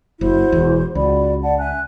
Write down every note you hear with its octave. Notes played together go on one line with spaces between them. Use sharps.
F#1 E4 F#4 C5
E1 E2
C#2 F#4 D5 B5
D5 F#5 A5
E5 G#5 F#6